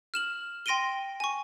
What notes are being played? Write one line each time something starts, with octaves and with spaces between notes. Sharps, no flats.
F6 E7 F#7
G5 C6 A#6 D7 D#7 G7
G#5 C#6